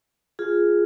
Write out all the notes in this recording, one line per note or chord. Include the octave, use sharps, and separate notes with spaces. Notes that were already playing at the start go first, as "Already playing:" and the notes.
F4 G#4